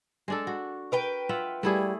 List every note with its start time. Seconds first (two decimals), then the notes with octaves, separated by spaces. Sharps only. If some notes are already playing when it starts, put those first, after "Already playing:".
0.28 G#3 D4 A4
0.47 F#4
0.92 A#4 B4 G5
1.29 F4 E5 F#5
1.63 G3 A3 E4 G#4